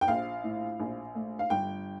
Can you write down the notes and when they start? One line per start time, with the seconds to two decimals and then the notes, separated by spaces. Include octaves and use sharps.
0.01 G5
0.08 A#1 F5
0.44 A2
0.80 A#1
1.15 A3
1.39 F5
1.50 G1 G5